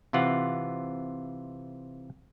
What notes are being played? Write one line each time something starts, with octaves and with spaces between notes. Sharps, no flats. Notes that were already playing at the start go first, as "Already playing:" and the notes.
C3 E3 F4 F#5